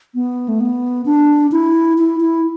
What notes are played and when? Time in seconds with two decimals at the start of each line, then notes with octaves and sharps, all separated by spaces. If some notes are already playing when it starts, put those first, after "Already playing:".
0.15 B3
0.48 A3
0.60 B3
1.06 D4
1.52 E4
1.98 E4
2.20 E4